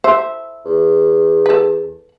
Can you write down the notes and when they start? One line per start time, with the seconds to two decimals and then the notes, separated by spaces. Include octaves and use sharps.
0.04 C5 E5
0.65 E2
1.46 A4 B4